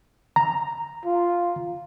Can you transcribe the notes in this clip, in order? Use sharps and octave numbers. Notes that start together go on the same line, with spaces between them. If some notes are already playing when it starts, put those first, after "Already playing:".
A#5
F4